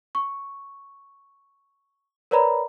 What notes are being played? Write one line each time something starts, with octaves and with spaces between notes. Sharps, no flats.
C#6
A#4 B4 C#5 D5 A#5 B5